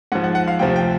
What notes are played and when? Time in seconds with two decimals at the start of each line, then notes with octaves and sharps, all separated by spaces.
0.12 G#2 F3 F#5
0.24 F#5
0.35 F#5
0.48 F5
0.59 D2 C3 F3 G5
0.76 G5